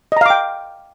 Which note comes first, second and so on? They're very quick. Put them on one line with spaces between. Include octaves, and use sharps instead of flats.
D#5 A#5 F5 D6 G5